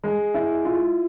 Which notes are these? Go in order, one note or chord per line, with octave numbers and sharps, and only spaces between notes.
G#3
E4
F4